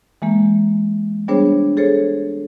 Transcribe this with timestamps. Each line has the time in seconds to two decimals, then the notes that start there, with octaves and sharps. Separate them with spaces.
0.22 E3 G#3 A#3
1.28 G3 B3 D4 G#4 C5 C#5
1.77 G#4 A4 C5 C#5